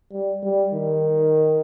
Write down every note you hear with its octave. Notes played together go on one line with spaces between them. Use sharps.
G3
G3
D#3